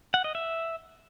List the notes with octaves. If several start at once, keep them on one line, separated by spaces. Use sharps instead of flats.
F#5
D#5
E5